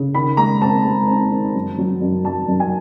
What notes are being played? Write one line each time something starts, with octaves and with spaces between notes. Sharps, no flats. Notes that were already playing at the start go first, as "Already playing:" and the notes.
Already playing: C#3
D#3 B5
G#3 A#5
C4 A5
G#3
C4
D#3
F#2
F#3
F#2
F#2 A5
F#2
G#5